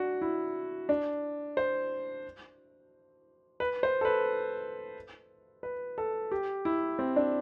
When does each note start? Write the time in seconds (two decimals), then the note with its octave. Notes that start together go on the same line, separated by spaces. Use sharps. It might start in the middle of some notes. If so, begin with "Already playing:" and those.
Already playing: D4 F#4
0.22 E4
0.89 D4
1.57 C5
3.60 B4
3.83 C5
4.01 A4
4.05 B4
5.63 B4
5.98 A4
6.32 G4
6.65 E4
6.99 C4
7.16 D4